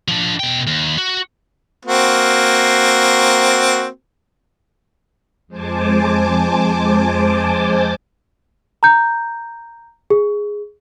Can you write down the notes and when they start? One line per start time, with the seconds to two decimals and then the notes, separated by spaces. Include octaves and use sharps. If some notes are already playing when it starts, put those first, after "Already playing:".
0.08 F3 D4
0.40 B2 G5
0.67 D#2
0.98 F#4
1.85 A#3 C4 F#4
5.48 F2 G#3 C5 G#5 A5 D6
8.83 A#5 G6
10.10 G#4